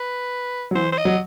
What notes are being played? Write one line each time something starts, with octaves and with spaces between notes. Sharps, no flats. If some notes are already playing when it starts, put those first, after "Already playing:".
Already playing: B4
F#3
E3 C5
C5
D#5
F#3